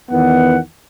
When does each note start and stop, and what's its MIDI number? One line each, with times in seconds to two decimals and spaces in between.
0.11 0.59 40
0.11 0.59 51
0.11 0.57 59
0.11 0.59 78